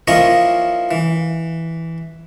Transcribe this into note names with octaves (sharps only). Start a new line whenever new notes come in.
F3 A#3 C#4 E4 C#5 D#5
E3